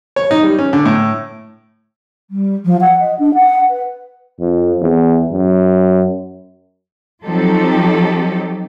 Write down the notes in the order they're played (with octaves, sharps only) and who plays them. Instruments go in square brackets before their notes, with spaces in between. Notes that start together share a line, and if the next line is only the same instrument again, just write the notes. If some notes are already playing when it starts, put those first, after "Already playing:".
[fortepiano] C#5
D#4
G3
C#4
D3
A2
[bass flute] G3
F3
F#5
D#5
D4
F#5
B4
[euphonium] F2
E2
F#2
[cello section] F3 F#3 C4 D#4 G4 A4